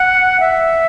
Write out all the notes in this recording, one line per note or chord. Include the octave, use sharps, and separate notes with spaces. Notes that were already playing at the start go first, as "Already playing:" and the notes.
Already playing: F#5
E5